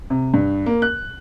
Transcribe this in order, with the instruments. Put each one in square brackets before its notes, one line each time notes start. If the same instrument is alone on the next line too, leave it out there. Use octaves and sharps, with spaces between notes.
[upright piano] C3
G2
A#3
F#6